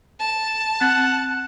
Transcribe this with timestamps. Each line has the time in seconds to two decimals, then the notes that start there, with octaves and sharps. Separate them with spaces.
0.20 A5
0.81 C4 F#5 A6